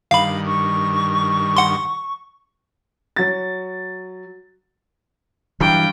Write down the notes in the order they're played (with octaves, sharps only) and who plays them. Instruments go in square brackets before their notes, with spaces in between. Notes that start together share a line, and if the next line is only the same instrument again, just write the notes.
[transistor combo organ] G2 D#3 [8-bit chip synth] F5 B5
[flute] C#6
[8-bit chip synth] F#5 C6
[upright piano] F#3 A6
[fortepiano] G2 [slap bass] E3 F#3 [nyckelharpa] F5 G5